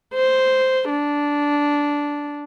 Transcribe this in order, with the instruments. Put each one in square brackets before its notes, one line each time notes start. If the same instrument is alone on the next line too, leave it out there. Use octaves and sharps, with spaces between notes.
[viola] C5
D4